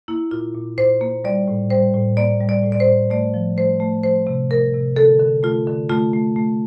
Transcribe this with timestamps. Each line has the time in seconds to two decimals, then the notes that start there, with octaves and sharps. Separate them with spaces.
0.08 A#3 E4
0.31 A#2 F4
0.55 A#2
0.78 A#2 C5
1.01 A#3
1.24 G3 D5
1.48 A2
1.70 G3 C5
1.94 A2
2.17 A#3 D5
2.40 G3
2.49 D5
2.63 A2
2.72 D5
2.80 C5
2.87 A2
3.10 A3 D5
3.34 F3
3.57 A3 C5
3.80 A3
4.03 F3 C5
4.27 C3
4.50 A3 A#4
4.74 C3
4.96 D3 A4
5.19 D3
5.43 A3 F4
5.67 D3
5.89 A3 F4
6.14 A3
6.36 A3